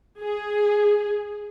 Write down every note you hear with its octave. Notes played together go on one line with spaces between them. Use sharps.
G#4